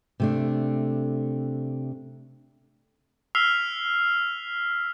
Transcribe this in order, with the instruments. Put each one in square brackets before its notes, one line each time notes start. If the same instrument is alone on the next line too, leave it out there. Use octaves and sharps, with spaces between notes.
[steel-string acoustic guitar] C3 A3 D4
[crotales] E6 F6 B6 C7 F7